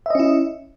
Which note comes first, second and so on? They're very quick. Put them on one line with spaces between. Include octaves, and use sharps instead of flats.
E5 D#5 C#4 E4